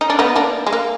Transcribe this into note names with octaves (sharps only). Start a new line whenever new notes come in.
D#4
D4
B3 D#4
A#3 D4
G#3
A#3